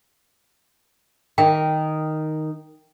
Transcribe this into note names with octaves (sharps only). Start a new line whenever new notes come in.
D#3 G5